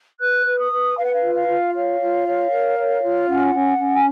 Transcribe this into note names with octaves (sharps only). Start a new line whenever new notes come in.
B4 F#6
B4
D#6
B4
B4 F5
F#5
F5
F4
F5
F4
C#5 F5
F4
C#5
A#4
C#5
F4
C#4 F#5
C#4
C#4
G#5